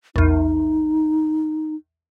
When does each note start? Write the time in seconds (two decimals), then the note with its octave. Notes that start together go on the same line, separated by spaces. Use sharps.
0.16 A#1 E2 D#4